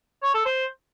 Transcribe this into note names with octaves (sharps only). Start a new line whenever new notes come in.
C#5
A4
C5